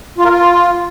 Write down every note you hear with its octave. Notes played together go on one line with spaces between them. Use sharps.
F4
A#4
F4